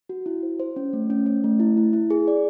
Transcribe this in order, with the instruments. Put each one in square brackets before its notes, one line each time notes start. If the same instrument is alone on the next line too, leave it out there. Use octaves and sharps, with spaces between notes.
[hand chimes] F#4
E4
C5
C5
C#4
A3
C#4
C#4
A3
E4
E4
E4
G#4
D5